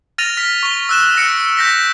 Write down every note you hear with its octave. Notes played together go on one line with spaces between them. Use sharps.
F6 A6 A#6 D#7 F7
F6 B6
C#6 G7
E6 F#6 E7
E6 A#6 C#7 D7
G6 A#6 B6